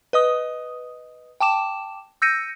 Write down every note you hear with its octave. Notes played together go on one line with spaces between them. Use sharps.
B4 D#5 D#6
G5 A5 D6 E7
E6 G6 A#6 C#7 D#7